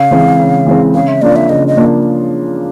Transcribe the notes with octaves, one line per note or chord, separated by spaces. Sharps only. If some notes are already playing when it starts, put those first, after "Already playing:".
Already playing: C#3 F5
E3 G#3 C4
C#3
E3 G#3 C4
C#3 F5
E5
F3 A#3 D4 F4 D5
E5
C#3 D#5
D#5
F3 A#3 D4 F4